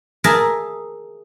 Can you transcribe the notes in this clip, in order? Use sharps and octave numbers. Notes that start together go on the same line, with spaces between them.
G#4 A#4 E5 A5